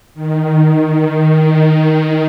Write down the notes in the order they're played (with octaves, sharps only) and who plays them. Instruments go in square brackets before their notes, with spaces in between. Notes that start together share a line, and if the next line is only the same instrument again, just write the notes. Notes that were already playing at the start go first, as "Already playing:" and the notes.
[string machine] D#3